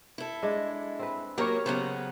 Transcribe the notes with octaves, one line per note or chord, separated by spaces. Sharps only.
E4 A4
G#3 D4
C4 B4
F#3 A#3 G4 A#4 C#5
C#3 F#3 B3 G4 C5